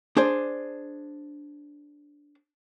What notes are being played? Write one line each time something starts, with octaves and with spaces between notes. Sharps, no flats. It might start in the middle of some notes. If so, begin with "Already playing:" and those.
D4 G#4 C5 D5